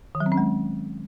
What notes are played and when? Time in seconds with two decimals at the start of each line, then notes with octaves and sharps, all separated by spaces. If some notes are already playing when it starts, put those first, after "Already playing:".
0.15 D#3
0.20 F#3
0.26 C4
0.32 C#4
0.37 G#3